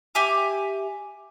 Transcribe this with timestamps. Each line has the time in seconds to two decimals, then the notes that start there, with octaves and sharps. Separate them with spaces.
0.15 G4 E5 G#5 D6